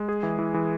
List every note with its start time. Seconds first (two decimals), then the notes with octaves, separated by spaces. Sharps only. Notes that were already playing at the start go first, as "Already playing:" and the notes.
Already playing: G#3
0.09 G#4
0.23 E3
0.39 E3
0.54 E3